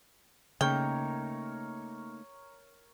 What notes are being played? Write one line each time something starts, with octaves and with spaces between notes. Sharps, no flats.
C#3 A3 A#3 D#4 A#4 C#5 G5 A#5